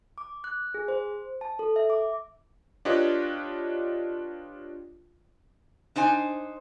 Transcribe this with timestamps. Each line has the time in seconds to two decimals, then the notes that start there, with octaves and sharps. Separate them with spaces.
0.18 D6
0.44 F#6
0.74 G#4
0.88 C5
1.41 A5
1.59 A4
1.76 E5
1.90 D6
2.85 D4 F4 G4 B4 C#5 D#5
5.96 D4 D#4 C5 G#5